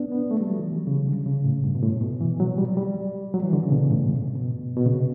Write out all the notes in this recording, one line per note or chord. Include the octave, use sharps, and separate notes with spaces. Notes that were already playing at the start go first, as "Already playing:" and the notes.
Already playing: B3 D4
B3
A3
G3
F#3
E3
C#3
D3
C#3
A2
G2
B2
A2
B2
E3
F#3
G3
G3
F#3
E3
D3
C#3
B2
A2
G2
B2
B2
C#3